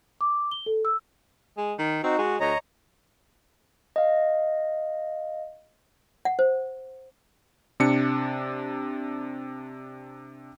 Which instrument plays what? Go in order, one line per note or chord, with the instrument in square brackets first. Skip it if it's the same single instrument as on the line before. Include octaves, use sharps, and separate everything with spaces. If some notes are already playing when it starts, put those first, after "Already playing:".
[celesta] D6
G7
A4
E6
[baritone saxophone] G#3
D#3
[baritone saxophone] C4 [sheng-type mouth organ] D#4 F#4
[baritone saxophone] G#3 [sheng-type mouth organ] F#4
[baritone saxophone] D2 [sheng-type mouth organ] C#5 D#5 A#5
[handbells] D#5 F5
[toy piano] F#5
C5
[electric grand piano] C3 D4 C#7